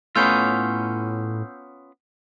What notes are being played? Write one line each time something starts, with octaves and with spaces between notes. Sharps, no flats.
A2 B3 C#4 F4 E6 G6 C7